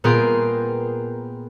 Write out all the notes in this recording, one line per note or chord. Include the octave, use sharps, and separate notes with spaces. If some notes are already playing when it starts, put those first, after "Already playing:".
A#2 B3 G#4 A#4 G5 C6